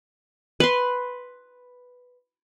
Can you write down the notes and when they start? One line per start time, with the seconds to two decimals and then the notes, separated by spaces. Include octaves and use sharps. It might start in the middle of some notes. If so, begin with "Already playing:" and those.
0.60 B4 C6